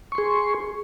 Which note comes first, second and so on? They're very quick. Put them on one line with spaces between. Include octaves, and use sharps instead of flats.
C#6 C6 G#4